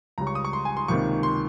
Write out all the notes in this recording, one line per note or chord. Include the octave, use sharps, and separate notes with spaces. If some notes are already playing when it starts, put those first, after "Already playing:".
C#2 C#3 G3 A#5
C#6
D#6
C#6
C6
G#5
C6
C#2 C3 D#3 A#3 C#6
C6